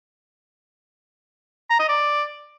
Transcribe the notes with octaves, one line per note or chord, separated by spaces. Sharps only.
A#5
D#5
D5